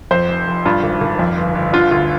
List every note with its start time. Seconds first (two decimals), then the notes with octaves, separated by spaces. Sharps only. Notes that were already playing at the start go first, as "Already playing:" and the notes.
0.11 F2 C5
0.29 F1
0.48 F1
0.65 G2 F4
0.84 G#1
1.01 G#1
1.19 F2
1.37 G1
1.55 G1
1.73 D3 F4
1.91 D2 F4